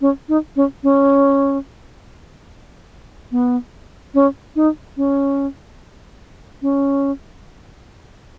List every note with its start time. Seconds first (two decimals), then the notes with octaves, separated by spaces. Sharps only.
0.01 C#4
0.29 D#4
0.56 C#4
0.83 C#4
3.32 B3
4.14 C#4
4.56 D#4
4.97 C#4
6.62 C#4